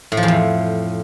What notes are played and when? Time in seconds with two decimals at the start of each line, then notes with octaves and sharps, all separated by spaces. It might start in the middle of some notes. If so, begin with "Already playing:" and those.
0.12 A2
0.17 F3
0.23 E2
0.28 F2